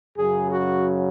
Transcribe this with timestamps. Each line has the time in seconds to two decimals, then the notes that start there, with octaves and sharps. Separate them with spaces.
0.17 F#2 C#3 F#3 G#4
0.51 F#4